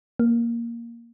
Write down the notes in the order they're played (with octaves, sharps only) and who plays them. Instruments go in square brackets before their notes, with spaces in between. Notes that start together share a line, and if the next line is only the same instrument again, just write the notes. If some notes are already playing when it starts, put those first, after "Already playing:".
[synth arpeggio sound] A#3